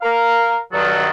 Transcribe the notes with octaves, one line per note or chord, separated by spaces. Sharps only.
A#4 F5
G2 D#3 F#3 A4